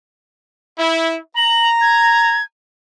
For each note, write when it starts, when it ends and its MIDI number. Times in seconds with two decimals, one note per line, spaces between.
0.79 1.19 64
1.36 2.41 82
1.36 1.69 102
1.81 2.43 92